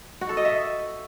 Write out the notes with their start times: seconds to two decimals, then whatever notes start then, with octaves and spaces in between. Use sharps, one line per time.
0.21 F#4
0.29 A4
0.37 D#5
0.45 E5